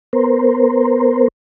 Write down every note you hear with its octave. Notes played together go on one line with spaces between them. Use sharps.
B3 A#4 C5